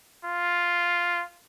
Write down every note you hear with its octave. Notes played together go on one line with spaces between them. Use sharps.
F4